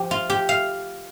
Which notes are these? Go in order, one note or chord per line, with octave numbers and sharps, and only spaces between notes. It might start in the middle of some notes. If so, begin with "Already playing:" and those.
Already playing: F3 G4
F4
G4
F5